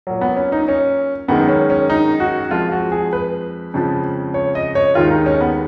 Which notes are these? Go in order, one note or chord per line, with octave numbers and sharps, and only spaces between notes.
A#2 F#3
B3
C#4
D#4
C#4
F#2 D#3 G#3 B3
C#4
C#4
D#4
F#4
F2 F3 G#3 F4
F#4
G#4
B4
F2 C#3 F3 G#3
C#5
D#5
C#5
D#2 D#3 G#3 F4
D#4
C#4
B3